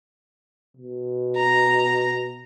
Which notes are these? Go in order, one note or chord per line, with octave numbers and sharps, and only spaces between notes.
B2
A#5